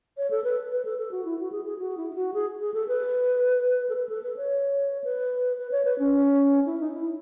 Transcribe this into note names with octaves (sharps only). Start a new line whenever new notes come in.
C#5
A4
B4
B4
A4
A4
F#4
E4
F#4
G#4
G#4
F#4
E4
E4
F#4
G#4
G#4
A4
B4
A4
B4
A4
B4
C#5
B4
B4
C#5
B4
C#4
E4
D#4
E4